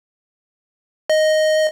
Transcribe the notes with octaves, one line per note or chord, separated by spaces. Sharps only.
D#5